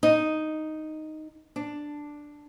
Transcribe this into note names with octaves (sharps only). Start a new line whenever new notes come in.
D#4
D4